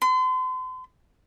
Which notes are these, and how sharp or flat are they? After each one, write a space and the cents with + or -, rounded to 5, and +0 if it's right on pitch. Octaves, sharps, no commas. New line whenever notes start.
C6 -40